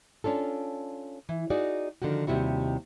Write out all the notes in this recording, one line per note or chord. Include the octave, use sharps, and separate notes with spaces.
C#4 D4 F4 A4
E3
D#4 F#4 G#4 D5
D3 D#3 F3 F#4
D#2 C3 G3 E4 F#4